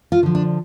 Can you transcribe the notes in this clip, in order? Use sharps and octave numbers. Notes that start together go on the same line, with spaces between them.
F4
D3 F3
D4